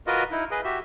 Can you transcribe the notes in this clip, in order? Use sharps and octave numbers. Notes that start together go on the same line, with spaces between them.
F4 F#4 A#4 B4 D#5
D#4 E4
G#4 B4 D#5
F#4 G4 E5